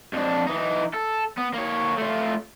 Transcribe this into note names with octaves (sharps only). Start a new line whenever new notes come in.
F2 D4
E3 D#4
A4
B3
A#3 C#5
A3 F4